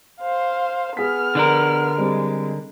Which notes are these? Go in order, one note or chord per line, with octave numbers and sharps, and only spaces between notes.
C5 F5
B3 G#4 F6 B6
D3 D4 A#4
G3 G#3 C4